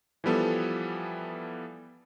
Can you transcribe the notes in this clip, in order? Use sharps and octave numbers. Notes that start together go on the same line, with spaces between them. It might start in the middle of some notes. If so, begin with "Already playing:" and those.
E3 F3 G3 B3 A4